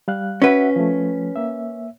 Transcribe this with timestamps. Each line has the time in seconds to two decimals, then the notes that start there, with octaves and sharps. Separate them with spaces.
0.08 G3 F5 F#6
0.42 C#4 F#4 B4 E5 F#5
0.76 F3 A3
1.36 A#3 E5